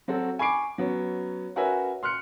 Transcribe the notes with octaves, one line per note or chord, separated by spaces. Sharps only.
F#3 C4 F#4 A4
G#5 B5 C#6 D6 C7 D7
F#3 B3 C#4
C#4 F#4 A#4 B4 E5 G#5
C6 F6 F#6 C#7